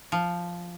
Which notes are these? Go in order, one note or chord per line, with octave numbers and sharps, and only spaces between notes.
F3